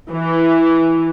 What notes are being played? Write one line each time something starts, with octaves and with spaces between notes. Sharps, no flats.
E3